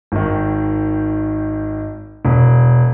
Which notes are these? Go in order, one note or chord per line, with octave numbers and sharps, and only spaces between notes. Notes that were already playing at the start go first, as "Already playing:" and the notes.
G#1 D#3
E1